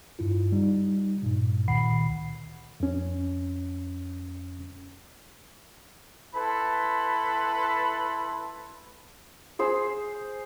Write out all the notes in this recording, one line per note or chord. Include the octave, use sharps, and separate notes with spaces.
G2 E4 F4
G3 D#4
G2 A#2
C#2 A#2 D#3 F#5 B5 C7
F2 C#4
E4 A4 B4 B5 C6
G#4 C5 E6